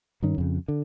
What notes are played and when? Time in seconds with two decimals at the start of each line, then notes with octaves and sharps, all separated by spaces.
0.22 G2 D#3 C#4
0.38 F2 C#3
0.68 D3